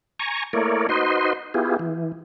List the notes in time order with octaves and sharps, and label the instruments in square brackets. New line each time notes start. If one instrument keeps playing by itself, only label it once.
[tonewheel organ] G#5 A#5 C#6
A3 A#3 E4 A#4 C#5 D5
D#4 F#4 B4 C5 D#5 C6
B3 E4 F4 G4 G#4
E3